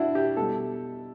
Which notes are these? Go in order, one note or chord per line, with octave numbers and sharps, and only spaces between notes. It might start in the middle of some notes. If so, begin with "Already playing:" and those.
Already playing: D4 E4 F#4
G4
B2 G3 A4